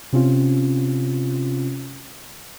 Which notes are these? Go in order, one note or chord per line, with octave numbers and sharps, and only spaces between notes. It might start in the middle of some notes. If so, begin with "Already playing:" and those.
C3 C4 C#4 F4